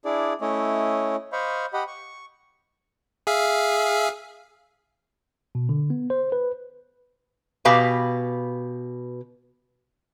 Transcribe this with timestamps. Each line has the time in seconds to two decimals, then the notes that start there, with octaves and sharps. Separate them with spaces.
0.05 D4 E4 G#4 D5
0.41 A3 C#4 E4 C#5 D#5
1.32 C5 D#5 F5 B5 C#6
1.73 G4 D#5 F#5 B5
1.87 C#6
3.27 G#4 E5 F5
5.55 B2
5.69 D3
5.90 B3
6.10 C5
6.32 B4
7.65 B2 G4 B4 F5 G#5